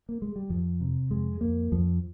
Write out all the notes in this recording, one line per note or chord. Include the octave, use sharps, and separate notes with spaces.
A#3
G#3
G3
F2 F3
C3
F2 G#3
F2 A#3
F2 F3